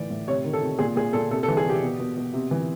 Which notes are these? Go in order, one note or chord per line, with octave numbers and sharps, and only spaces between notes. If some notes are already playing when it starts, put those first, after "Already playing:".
Already playing: A2 E3 D5
A2
C3 C#5
D#3
A4
C3
A#2 G#4
A#2 G#4
A#2 A4
C3 A4
A4
E3
G#4
C3 G4
B2
B2
B2
C3
E3